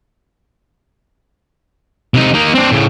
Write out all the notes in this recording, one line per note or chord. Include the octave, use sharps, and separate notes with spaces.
C3 D#4
A#3 D#4
C4 D4
A2 C#3